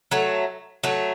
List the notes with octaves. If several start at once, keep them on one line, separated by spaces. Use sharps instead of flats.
F#3 A3
F#3 A3